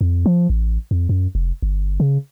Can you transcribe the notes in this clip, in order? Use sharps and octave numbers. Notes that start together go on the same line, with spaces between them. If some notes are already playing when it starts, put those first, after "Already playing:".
F2
F3
A1
F2
F#2
F1
G1
C#3